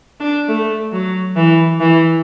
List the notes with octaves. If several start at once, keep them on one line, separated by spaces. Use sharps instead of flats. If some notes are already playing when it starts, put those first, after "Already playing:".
D4
A3
F#3
E3
E3